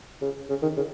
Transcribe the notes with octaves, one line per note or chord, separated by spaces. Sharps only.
C#3
C#3
D#3
C#3